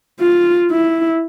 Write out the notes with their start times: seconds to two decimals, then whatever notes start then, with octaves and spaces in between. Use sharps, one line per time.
0.20 F4
0.71 E4